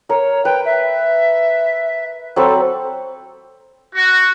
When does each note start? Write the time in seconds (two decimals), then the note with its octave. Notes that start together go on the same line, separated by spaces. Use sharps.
0.09 A#4 C#5
0.45 B4 G5
0.65 E5
2.36 F#3 C4 A4 B5
3.96 F#4